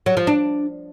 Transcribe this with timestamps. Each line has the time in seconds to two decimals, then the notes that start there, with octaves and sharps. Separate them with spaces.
0.06 F#3
0.17 F3
0.27 D4